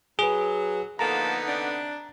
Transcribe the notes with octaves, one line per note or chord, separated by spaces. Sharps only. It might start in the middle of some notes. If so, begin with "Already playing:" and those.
F#3 G#4 B4
D3 F3 A#3 B3 D#4 A4 A#5
C3 D4